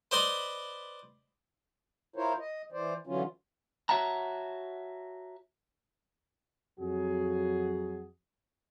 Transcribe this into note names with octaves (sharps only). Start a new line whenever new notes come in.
B4 C5 D5 D#5 B5 C6
E4 F4 A#4 C5 C#5
D#5
E3 C5 D5
D3 E3 F#3 C#4 F4
F#4 C#5 E5 F#5 A5 A#5
F2 F#3 F#4 G#4